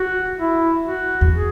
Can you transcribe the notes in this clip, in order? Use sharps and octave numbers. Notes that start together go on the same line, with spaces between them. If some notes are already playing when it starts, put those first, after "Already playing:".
Already playing: F#4
E4
F#4
E2
G#4